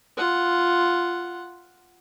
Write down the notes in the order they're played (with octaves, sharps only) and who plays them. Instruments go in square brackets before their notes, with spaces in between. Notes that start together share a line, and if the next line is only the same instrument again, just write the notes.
[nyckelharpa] F4 F#5